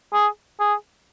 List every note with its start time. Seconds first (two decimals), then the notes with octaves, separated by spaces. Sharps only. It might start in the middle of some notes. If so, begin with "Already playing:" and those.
0.13 G#4
0.60 G#4